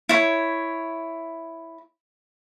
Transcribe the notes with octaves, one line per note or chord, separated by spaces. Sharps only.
E4 C#5